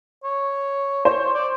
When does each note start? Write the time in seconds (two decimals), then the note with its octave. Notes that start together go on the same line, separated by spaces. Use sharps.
0.24 C#5
1.05 C5 C#5
1.34 D5